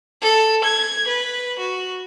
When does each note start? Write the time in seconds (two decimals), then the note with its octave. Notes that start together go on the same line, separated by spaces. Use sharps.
0.22 A4
0.64 G#6
1.08 B4
1.59 F#4